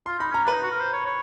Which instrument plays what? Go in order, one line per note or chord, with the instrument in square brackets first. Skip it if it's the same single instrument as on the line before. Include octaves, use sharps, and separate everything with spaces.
[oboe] F4 [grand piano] C6
[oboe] D#4 [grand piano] B5
[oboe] C#4 [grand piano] A#5
[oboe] D4
[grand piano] B4 B5
[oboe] D#4
F#4
A#4
C5
C#5
C#5